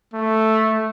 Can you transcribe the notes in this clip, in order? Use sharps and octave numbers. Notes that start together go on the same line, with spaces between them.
A3